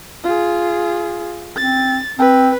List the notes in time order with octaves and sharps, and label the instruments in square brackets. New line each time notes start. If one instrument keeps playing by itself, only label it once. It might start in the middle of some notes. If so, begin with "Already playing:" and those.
[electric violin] F4 G#4
[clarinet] C4 [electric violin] A6
[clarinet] C4 [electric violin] B4